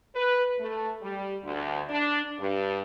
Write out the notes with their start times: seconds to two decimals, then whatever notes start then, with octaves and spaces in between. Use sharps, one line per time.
0.15 B4
0.60 A3
1.01 G3
1.43 D2
1.90 D4
2.39 G2